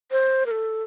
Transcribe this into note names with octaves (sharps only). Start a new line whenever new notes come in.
C5
A#4
A4